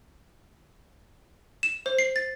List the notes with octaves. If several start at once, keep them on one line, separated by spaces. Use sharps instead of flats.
E7
C5
C7
A6